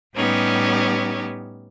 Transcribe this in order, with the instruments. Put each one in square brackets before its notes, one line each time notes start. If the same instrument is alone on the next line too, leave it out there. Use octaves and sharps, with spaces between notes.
[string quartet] A2 G3 B3 C#4 D#4 G4